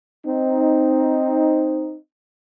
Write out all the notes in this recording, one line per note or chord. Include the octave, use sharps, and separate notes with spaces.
C4 D#4